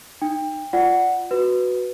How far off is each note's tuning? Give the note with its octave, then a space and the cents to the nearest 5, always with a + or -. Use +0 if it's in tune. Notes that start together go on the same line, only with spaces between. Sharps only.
D#4 -25 G5 +25
F4 +0 D5 +0 F#5 +0
F#4 +0 B4 +0